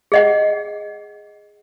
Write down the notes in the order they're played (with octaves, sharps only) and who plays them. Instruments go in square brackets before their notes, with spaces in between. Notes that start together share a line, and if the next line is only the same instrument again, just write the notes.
[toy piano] G#4 D#5 F#5